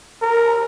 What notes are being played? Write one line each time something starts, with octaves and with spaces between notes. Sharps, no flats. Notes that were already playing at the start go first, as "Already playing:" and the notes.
A#4